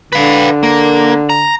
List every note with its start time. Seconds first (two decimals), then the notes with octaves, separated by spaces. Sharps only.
0.13 D3 B4 F5
0.63 A#3
1.30 A#5